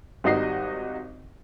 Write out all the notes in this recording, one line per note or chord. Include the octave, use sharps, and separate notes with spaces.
G#1 G3 D#4 F#4 D#5 C7